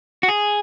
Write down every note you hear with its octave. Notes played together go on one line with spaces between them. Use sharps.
F#4
G#4